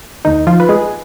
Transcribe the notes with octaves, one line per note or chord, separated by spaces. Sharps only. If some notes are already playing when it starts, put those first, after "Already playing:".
D#2 D#3 D#4
F3 F4
B4
G#3 G#4